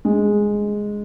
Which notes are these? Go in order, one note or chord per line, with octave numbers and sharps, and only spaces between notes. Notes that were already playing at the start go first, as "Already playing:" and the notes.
G#3